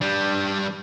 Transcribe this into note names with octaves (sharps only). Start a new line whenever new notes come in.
G3 D4